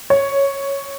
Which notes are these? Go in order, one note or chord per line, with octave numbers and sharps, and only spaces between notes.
C#5